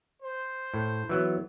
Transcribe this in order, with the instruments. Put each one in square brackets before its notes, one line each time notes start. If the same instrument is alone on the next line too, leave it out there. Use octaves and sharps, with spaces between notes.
[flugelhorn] C5
[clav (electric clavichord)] A2
E3 F#3 B3